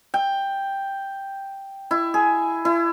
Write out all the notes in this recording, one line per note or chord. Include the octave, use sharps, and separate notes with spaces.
G5
E4
G#4
E4